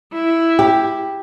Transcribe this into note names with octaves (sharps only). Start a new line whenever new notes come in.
E4
G4